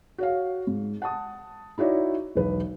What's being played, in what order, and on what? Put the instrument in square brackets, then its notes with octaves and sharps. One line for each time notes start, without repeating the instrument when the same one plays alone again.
[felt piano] F#4 C#5 F5
G#2
F#5 A5 D#6
D#4 E4 F#4 C#5 D5
E1 B1 B4